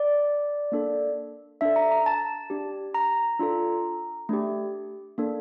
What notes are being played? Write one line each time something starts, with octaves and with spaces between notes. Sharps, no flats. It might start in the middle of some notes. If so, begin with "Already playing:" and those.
Already playing: D5
A#3 D4 A4
D4 A4 E5
A#5
A#5
A5
D4 G4
A#5
D4 F4 A4
A3 D4 G4
A#3 D4 A4